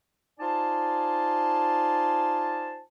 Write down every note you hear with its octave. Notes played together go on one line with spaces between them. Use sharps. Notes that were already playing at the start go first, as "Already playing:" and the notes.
D#4 F4 C5 D5 G#5 A5